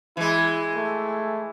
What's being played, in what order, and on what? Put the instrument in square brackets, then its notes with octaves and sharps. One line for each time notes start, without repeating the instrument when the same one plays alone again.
[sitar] E3 G#3 [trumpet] E4
[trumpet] A3